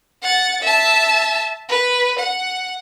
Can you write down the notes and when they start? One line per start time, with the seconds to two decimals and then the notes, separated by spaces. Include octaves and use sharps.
0.23 F#5 A6
0.62 E5 A5
1.69 B4
2.19 F#5